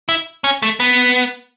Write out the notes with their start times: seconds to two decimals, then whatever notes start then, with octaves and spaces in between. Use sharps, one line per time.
0.09 E4
0.44 C#4
0.62 A3
0.80 B3